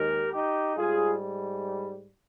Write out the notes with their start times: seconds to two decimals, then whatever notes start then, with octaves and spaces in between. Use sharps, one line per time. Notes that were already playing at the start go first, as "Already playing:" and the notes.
Already playing: D#2 D#3 G#3 G4 A#4
0.33 D#4 G4
0.75 G#2 G3 F4 G#4